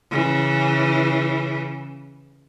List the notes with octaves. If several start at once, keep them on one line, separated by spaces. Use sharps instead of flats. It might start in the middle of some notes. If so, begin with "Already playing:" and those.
C#3 E3